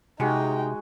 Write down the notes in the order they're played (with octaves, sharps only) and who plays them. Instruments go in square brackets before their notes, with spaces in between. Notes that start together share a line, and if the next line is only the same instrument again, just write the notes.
[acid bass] C3 [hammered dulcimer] G#3 F#4 [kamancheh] D#4 G5